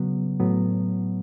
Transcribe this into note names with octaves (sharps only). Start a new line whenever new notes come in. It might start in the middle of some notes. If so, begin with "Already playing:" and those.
Already playing: C#3 F#3 B3
A2 F#3 B3